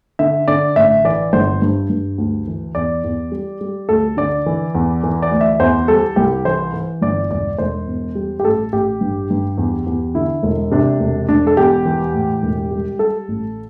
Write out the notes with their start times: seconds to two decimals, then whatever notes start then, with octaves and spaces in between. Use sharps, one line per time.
0.19 D3 E5
0.48 D3 D5
0.76 A1 E5
1.05 E3 D5
1.33 G1 C5
1.62 G2
1.90 G2
2.18 D2
2.47 E3
2.75 E2 D5
3.04 E2
3.32 G3
3.61 G3
3.89 D2 A4
4.17 D3 D5
4.46 E3
4.75 E2
5.03 E3
5.22 D5
5.31 D2
5.41 E5
5.60 E2 C5
5.88 G3 A4
6.16 C2 G4
6.45 E3 C5
6.74 E3
7.01 G1 D5
7.30 E1 D5
7.58 E1 C5
7.87 E2
8.15 G3
8.40 G4
8.45 A1 A4
8.73 A1 G4
9.01 G2
9.30 G2
9.58 E2
9.87 E2
10.15 D3 E4
10.43 E1
10.71 C3 D4
11.00 E1
11.29 E1 D4
11.47 A4
11.57 E2 G4
11.85 E3
12.14 A2
12.43 E1
12.71 G3
12.99 G3 A4
13.28 A1